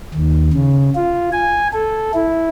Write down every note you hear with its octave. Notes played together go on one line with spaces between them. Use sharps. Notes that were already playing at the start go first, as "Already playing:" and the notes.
D#2
C#3
F4
G#5
A4
E4